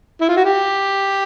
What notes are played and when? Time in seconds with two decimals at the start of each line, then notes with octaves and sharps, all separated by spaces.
0.21 E4
0.29 F4
0.37 F#4
0.45 G4